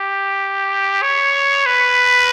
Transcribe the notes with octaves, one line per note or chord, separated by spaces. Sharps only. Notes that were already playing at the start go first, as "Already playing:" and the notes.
Already playing: G4
C#5
B4